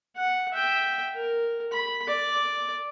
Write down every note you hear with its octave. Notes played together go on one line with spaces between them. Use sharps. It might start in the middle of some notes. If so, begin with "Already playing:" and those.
F#5
E5 G5
A#4
B5
D5